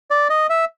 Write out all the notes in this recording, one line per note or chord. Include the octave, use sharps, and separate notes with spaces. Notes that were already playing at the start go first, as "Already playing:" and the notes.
D5
D#5
E5